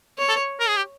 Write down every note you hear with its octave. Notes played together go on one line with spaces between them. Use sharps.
C#5
A4
A#4
G#4
G4